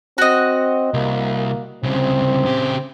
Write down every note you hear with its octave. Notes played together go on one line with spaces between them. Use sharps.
C4 F#4 D#5
C2 A#3
C2 C#3 C4
C#3 G4